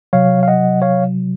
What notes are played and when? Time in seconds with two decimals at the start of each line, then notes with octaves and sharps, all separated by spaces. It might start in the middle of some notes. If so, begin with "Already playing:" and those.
0.13 C3 F#3 C#5 F5
0.43 F5
0.48 D#5 F#5
0.82 C#5 F5